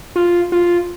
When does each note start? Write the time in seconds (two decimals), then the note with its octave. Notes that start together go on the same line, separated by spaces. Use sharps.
0.16 F4
0.52 F4